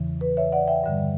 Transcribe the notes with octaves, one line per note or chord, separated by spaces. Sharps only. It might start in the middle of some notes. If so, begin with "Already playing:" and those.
Already playing: E2 C#3 E3
B4
C#5 E5
D5 F#5
E5 G5
G2 D3 G3